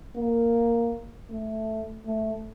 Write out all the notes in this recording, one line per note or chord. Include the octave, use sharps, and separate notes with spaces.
A#3
A3
A3